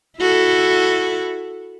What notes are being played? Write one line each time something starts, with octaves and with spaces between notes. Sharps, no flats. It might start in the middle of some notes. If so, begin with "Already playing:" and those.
E4 F#4 A4